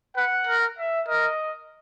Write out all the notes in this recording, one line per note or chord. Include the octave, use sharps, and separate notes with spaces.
B4 F#5
A#4
E5
A#4 D#5